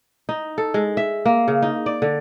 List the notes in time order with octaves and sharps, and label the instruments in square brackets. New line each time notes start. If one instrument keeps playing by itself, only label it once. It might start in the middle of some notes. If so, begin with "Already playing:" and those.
[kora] D#4
A4
G#3
E5
A#3
C#3
D#4
D5
D3